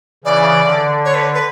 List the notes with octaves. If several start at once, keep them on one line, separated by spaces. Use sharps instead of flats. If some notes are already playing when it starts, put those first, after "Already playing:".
C#3 E3 D5
D3
C#5
B4
B4